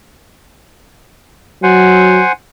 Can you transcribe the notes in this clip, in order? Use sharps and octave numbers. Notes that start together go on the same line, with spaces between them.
F#3 C5 F#5 G#5